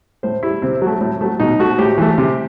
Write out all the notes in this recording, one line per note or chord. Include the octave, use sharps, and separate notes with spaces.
A2 C5
G3 E4
C3 C4
F#3
A3
A2
F#3 A3
B2 D#4
A3 F#4
A2 G4
E3 A3
C3